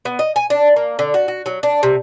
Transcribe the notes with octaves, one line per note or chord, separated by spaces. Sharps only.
B3
D#5
G#5
D4
A#3
D3
F#4
F#4
F#3
D4
C3